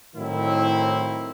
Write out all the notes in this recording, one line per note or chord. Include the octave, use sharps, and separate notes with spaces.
A2 D#3 F#3 C4 E4